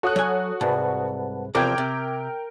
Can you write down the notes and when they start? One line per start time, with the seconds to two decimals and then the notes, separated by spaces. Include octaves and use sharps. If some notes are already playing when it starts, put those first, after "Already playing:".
0.03 F#4 A4 C#5 D#6 F#6
0.16 F#3 G#5
0.61 C2 G#2 B4 F#5 A5
1.55 E2 C3 F3 A#4 G5 D6 G6 G#6
1.78 C3